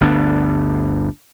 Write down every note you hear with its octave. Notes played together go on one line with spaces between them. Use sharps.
G1 D2 B3 D4